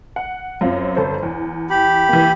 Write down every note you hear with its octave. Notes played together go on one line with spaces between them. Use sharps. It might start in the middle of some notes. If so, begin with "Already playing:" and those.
F#5
F#2 C4 F4
G1 A4 C5
E2
G4 B5
E3 A#3